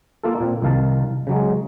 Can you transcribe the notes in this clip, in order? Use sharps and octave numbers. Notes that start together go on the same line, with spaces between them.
A#3 F4 A4
A#2 C4
C2 D#3 F5 A5
C#3 F#3 G#3